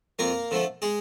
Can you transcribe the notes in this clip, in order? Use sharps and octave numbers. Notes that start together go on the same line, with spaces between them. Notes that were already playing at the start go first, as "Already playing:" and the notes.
F2 A#3 A#4
D3 F3 A3
G#3 G#4